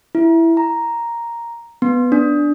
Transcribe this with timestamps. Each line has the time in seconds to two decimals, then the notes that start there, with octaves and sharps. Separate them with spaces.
0.15 E4
0.57 A#5
1.82 B3
2.12 D4